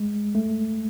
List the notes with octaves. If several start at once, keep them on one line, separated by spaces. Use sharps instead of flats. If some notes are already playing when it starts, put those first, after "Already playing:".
Already playing: G#3
A3